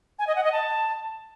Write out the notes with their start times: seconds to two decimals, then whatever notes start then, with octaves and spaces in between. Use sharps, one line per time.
0.19 G#5
0.27 D#5
0.36 F#5
0.44 D#5
0.52 A5